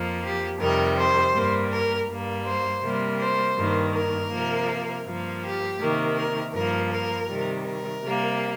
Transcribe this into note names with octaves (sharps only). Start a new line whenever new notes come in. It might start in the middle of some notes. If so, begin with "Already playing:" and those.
Already playing: F2 F3 A#3
G4
F2 C3 D#3 G3 A#4
C5
G2 G3 A#3
A#4
G2 G3 A#3
C5
C3 G3 A#3
C5
G2 D#3 A#3
A#4
C3 F3 A#3
G2 F3 A#3
G4
C3 D#3 A#3
A#4
G2 F3 A#3 A#4
A#4
C3 D#3 G3
A#4
C3 G3 A#3